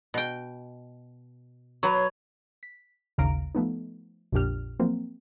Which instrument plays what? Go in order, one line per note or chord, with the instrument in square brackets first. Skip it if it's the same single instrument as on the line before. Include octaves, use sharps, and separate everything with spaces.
[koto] B2 G5
[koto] F#3 [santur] B4 C#5
[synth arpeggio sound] B6
A1 D#2 C#3 F5 A#5 D7
F3 A3 B3 D#4
A#1 F2 A#2 D4 G4 F6
F3 F#3 A#3 C4